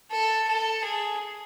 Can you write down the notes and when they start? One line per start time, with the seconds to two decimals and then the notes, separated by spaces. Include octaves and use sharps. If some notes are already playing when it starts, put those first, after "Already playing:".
0.11 A4
0.48 A4
0.85 G#4